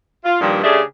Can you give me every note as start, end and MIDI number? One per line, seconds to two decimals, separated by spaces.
0.24 0.37 65
0.40 0.61 43
0.40 0.61 46
0.40 0.61 51
0.40 0.61 53
0.40 0.61 55
0.63 0.80 49
0.63 0.80 57
0.63 0.80 62
0.63 0.80 67
0.63 0.80 68